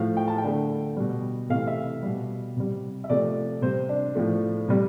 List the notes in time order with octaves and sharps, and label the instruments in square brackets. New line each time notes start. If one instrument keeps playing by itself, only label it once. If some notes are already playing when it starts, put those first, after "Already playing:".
Already playing: [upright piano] A2 F3 A3 F5
G5
A5
G5
D3 A3
B2 G3
C3 E3 A3 F5
E5
B2 G3
C3 G3
E5
C3 F3 A3 D5
C3 G3 C5
D4
A2 F3 A3
C3 G3